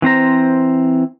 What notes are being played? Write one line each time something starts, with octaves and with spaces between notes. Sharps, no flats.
E3 C4 C5 A#5